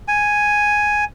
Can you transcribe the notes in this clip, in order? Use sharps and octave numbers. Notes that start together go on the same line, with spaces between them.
G#5